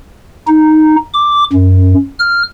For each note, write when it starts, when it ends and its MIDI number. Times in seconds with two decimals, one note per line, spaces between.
0.47 0.96 63
1.14 1.44 86
1.53 1.94 42
2.19 2.43 89